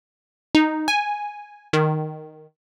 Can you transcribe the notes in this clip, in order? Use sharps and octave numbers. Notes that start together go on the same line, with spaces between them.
D#4
G#5
D#3